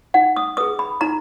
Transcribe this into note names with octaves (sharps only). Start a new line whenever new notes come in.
D#4 F#5
D#6
G#4 B4 D#6
B5
D#4 A#5